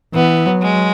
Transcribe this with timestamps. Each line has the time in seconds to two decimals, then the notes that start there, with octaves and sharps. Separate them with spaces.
0.14 E3 B3
0.46 F#3
0.62 G#3